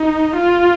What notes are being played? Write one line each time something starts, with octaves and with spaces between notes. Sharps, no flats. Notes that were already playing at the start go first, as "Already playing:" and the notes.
Already playing: D#4
F4